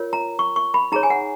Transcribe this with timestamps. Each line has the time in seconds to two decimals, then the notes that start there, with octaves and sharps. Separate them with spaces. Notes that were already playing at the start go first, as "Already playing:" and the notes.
Already playing: F4 A#4 C#5
0.13 A#5
0.39 C#6
0.56 C#6
0.74 B5
0.92 D#4 G#4 C#5 A#5
1.03 G#5
1.10 F#5